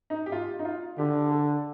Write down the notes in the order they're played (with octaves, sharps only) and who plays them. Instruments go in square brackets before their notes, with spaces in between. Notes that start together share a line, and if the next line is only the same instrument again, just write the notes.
[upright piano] D#4
G4
F4
D#4
F4
[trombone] D3 [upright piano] G4
[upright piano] A4